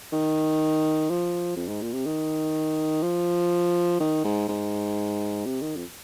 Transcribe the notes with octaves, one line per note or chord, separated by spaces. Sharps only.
D#3
F3
F2
G#2
A#2
C3
D#3
F3
D#3
G#2
G#2
C3
D#3
F2